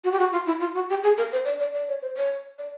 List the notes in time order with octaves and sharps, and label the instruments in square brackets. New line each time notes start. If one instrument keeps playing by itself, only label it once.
[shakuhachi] F#4
G4
F#4
F4
E4
F4
F#4
G4
G#4
A#4
C5
D5
D5
D5
C#5
C5
C#5
D5